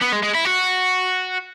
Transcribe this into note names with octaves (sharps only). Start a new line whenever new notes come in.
B3
G#3
G#3
E4
F#4